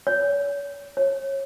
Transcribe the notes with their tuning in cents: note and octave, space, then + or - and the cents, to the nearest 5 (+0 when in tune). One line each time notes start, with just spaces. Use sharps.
C#5 +40
C#5 -25